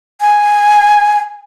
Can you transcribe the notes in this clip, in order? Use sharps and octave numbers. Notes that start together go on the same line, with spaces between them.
G#5